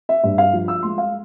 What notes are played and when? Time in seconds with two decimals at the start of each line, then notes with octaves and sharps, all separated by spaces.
0.09 E5
0.24 G2 E5
0.38 F5
0.53 F3
0.68 E6
0.83 G#3 C6
0.98 F5